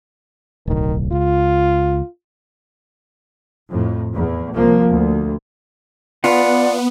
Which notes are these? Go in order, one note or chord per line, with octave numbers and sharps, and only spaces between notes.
D1 B1 D#3
C#2 F4
F2 A2
E2
C2 F3 A#3
D2
B3 F4 D5 F#5 A5 B5